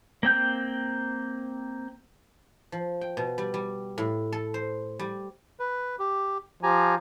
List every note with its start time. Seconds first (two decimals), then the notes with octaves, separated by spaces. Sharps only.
0.23 A#3 C4 G5 G6
2.72 F3
3.01 G5
3.17 B2
3.38 G3
3.54 G3
3.98 A2
4.32 A4
4.54 C5
4.99 G3
5.60 B4
5.99 G4
6.63 F3 G4 G#5 A#5